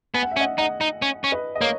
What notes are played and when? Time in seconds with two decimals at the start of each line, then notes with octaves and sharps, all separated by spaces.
0.14 B3 G#5
0.23 F#5
0.31 E5
0.37 C#4
0.40 D#5 F#5
0.58 D#4 D#5 F#5
0.81 D#4
1.02 C#4
1.24 C#4
1.32 B4 D#5
1.55 D#5
1.61 A#3 A#4 C#5